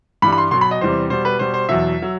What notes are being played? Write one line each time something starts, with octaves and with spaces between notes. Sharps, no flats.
G2 E3 G3 B5
B5
C6
B2 F#3 C6
B5
D#5
E2 C3 E3 G3 C5
B2 G3 C5
B4
B2 G3 C5
C5
E2 B2 F#3 E5
F#3